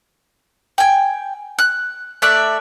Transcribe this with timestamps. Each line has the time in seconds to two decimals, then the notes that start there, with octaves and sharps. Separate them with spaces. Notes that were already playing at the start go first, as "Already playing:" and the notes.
0.78 G5 G#5
1.59 F#6
2.22 A3 D5 E5 F#6